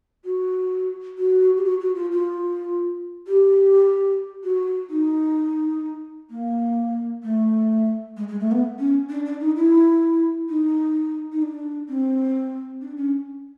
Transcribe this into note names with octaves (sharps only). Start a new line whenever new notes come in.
F#4
F#4
G4
F#4
F#4
F4
F4
G4
F#4
D#4
A#3
A3
G#3
G#3
A3
B3
C#4
D4
D4
D#4
E4
D#4
D#4
D4
C4
D4
C#4